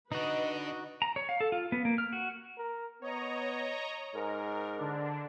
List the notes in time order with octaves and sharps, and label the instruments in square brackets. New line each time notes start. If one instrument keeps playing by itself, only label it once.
[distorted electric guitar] D3 [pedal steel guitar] D#4 F#4 [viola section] B4 D#5
[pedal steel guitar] A#5
C#5
F5
A4
F4
B3
A#3
F6
F#4
[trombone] A#4
[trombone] B3 [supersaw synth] C#5 D#5 A#5
[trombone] G#2 [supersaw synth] A#4
[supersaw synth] D3 D4